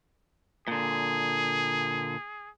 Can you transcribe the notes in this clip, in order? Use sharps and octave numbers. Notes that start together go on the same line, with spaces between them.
A#2 D3 G#4